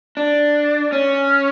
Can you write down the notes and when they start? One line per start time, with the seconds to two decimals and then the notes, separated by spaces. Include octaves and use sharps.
0.17 D4
0.92 C#4